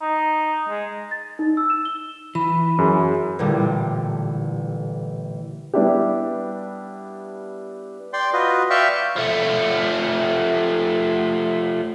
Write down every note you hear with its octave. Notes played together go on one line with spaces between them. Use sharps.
D#4
G#3
A6
D#4
E6
E7
G7
E3 B5
F#2 G#4
A1 A#2 D3 G3
G3 B3 D4 E4 G4
D5 G5 C6
F4 F#4 B4 D#5
D5 E5 F5 G5 C#6
F3 A3